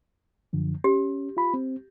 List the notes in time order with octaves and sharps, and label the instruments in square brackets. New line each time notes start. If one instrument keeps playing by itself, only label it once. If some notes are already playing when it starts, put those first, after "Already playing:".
[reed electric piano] F#2 D3 F3
[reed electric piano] C#4 [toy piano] G4
[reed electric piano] F4 B5
C4